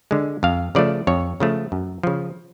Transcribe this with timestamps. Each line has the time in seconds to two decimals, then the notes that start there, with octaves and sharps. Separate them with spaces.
0.11 D3 G#3
0.43 F2 F5
0.75 C#3 F3 A3 D5
1.07 F2 C#5
1.40 C#3 F3 A3
1.72 F#2
2.03 C#3 F3